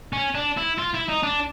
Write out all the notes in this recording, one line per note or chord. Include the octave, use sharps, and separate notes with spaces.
C#4
D4
E4
F4
E4
D#4
D4